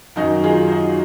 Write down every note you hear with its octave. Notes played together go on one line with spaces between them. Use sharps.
F#2 D#3 D#4 F#4
F4 G#4
D#4 F#4